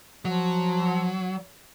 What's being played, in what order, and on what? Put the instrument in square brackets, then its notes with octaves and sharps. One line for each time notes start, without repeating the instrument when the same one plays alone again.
[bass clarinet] F3 [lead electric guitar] F#3